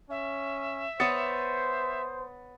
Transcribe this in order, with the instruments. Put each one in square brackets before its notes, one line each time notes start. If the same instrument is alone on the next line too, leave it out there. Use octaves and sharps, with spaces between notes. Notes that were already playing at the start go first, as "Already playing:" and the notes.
[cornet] C#4 [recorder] E5
[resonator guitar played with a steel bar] B3 C#5 [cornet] C5 [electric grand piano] D#6 A6 C#7